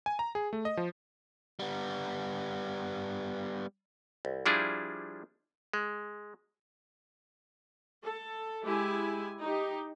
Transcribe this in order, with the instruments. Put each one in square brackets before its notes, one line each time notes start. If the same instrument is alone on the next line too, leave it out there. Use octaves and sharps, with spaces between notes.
[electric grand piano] G#5
A#5
G#4
A3
D#5
F3
[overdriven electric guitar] G3 B3
[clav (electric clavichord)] C2
F3 G3 D4 E4 F4 G#4
G#3
[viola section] A4
G#3 E4 G4 G#5
D#4 G4